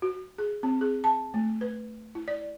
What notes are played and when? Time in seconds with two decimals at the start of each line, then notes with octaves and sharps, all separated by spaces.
0.02 F#4
0.38 G#4
0.63 C4
0.81 G#4
1.04 A5
1.34 A3
1.61 B4
2.15 E4
2.28 D5